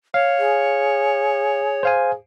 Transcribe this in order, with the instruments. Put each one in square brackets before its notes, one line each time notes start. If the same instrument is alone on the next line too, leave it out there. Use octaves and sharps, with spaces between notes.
[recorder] C#5 [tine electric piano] F5
[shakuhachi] G#4
[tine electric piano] C5 F5 G#5